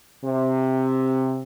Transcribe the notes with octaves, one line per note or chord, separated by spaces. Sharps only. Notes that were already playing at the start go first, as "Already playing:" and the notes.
C3